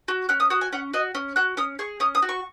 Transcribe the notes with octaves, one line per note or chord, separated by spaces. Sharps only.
F#4
C#4 F#6
D#6
F#4 D#6
G#5
C#4 F#5
F#4 D#5
C#4
F#4 F#6
C#4 D#6
G#4 C#6
C#4 D#6
D#6
F#4
C#6